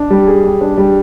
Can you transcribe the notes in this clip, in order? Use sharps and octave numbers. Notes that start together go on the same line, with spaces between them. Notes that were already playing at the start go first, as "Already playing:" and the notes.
Already playing: D4
G3
G#4
G3
D4
G3